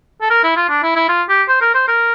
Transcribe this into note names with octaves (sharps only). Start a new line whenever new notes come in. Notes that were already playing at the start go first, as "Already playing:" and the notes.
A4
A#4
E4
F4
D4
E4
E4
F4
G4
C5
A#4
C5
A#4